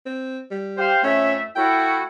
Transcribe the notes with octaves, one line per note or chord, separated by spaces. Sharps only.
C4
G3
G4 C5 F5
F2 A3 C#4 E5
A3 E4 F#4 G5